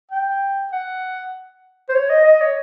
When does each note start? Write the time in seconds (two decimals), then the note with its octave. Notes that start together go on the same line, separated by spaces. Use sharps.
0.11 G5
0.72 F#5
1.89 C5
1.94 C#5
2.10 D#5
2.25 D#5
2.41 C#5